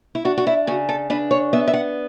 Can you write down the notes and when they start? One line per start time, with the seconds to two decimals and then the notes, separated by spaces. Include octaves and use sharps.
0.15 E4
0.25 D4 F#4
0.37 F#4
0.47 E4
0.67 C#3 F#4
0.89 A4
1.10 D4 B4
1.31 C#5
1.53 B3 E5
1.68 E5
1.73 F#5